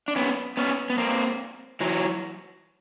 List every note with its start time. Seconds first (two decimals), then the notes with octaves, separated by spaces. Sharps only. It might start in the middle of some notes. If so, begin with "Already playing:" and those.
0.08 D4
0.16 B3 C#4
0.57 B3 C#4
0.90 B3
0.98 A#3 C4
1.80 E3 F#3